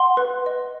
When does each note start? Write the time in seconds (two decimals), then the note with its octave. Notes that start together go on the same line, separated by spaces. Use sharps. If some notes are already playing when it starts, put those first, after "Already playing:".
Already playing: F#5 C6
0.17 B4
0.46 D#5